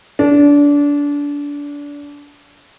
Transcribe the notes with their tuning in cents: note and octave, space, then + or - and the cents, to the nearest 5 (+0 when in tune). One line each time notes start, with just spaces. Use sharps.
D4 -25